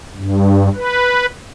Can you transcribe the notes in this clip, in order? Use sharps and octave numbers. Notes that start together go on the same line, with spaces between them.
G2
B4